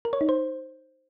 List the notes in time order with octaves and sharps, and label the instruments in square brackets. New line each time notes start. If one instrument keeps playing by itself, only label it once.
[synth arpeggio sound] A#4
C#5
D#4
C5